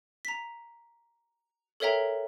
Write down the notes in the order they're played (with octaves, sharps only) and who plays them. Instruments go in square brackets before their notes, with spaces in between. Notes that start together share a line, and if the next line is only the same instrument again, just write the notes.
[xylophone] A#5 B6
A4 A#4 C#5 E5 G5 A#5